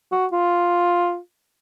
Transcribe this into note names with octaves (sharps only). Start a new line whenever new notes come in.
F#4
F4